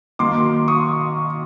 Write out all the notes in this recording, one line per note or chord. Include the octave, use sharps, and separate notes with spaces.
D#3 F#3 A#3 C6 D6
C#6 D#6